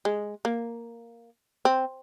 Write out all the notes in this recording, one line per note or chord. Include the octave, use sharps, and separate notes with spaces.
G#3
A#3
C4